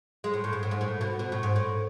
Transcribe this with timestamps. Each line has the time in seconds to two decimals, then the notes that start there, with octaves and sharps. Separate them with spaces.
0.24 G#3
0.34 A2
0.44 A2
0.53 G#2
0.63 A2
0.71 G#2
0.81 A2
1.01 B2
1.19 B2
1.32 A2
1.43 G#2
1.56 A2